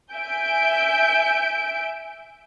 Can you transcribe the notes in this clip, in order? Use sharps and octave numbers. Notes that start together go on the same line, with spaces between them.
E5 G#5 G6 D7